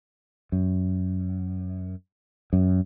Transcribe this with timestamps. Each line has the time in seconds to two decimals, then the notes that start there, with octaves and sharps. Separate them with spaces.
0.52 F#2
2.53 F#2